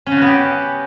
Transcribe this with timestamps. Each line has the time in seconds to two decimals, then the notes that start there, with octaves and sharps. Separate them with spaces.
0.06 C#4
0.12 C#3
0.17 F#4
0.22 B3
0.27 G4